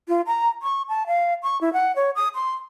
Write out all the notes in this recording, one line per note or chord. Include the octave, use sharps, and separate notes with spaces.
F4
A#5
C#6
A5
F5
C#6
E4
F#5
C#5
D#6
C6